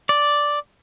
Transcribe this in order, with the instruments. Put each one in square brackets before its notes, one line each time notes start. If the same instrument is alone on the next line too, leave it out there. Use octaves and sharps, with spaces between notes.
[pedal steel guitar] D5